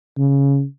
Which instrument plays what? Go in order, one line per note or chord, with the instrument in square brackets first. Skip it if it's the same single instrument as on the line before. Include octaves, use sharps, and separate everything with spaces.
[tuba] C#3